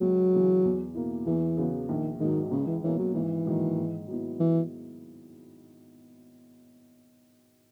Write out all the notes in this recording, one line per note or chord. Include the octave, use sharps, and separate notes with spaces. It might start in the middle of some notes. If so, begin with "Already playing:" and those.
C#2 F#3
C#3 E3
E2
B2 A#3 E4
E2 E3
C#3 F#3 B3
A#1 D#3
G#2 D#3 F#3
C#2 C#3
E3
B2 E3 A#3 C#4
F#3
G#1 E3
G#2 D#3 F#3 A#3
G#2
F#3 B3 E4
E3